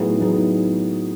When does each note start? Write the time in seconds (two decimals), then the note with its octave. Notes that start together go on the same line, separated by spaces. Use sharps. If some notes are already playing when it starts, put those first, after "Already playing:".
Already playing: A2 F#3 B3 D#4 G#4
0.20 A2 F#3 B3 D#4 G#4